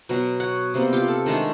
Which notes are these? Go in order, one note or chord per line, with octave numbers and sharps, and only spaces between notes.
B2 F#3
C#5 F#5
C3 G3 A#3 B3
F4 G4
A4
D#3 G#3 A3 D4